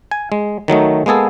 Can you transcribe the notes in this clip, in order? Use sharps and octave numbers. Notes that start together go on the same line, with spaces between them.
G#5
G#3
D#3 F#3 A3 D#4
G#3 A#3 B3 G#4 A4